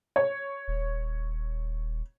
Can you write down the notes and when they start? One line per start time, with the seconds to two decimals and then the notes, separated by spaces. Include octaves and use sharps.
0.16 C#5
0.68 D#1